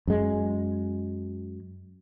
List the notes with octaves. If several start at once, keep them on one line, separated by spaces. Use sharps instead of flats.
F#2 G#3